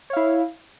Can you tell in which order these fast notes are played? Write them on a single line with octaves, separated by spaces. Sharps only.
C#5 F5 E4